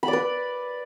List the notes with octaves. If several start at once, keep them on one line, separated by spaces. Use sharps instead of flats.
B5
D5
B4